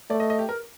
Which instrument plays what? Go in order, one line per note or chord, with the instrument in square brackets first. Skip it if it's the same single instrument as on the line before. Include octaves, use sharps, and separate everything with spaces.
[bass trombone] A3 [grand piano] D5
[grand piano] D#5
D#5
G4
A#4